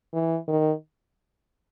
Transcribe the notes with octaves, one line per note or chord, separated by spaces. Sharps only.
E3
D#3